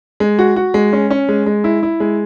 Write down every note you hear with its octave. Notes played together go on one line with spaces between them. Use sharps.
G#3
F#4
F#4
G#3
C#4
C#4
G#3
G#3
E4
E4
G#3